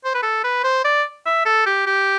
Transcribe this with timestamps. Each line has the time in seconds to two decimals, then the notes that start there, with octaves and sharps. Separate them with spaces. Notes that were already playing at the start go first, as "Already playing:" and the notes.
0.05 C5
0.15 B4
0.23 A4
0.44 B4
0.64 C5
0.84 D5
1.26 E5
1.45 A4
1.66 G4
1.87 G4